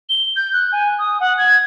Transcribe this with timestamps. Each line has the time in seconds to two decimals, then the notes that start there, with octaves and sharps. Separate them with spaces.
0.09 G7
0.36 G6
0.53 F#6
0.72 G#5
0.99 D#6
1.20 F#5
1.38 G#6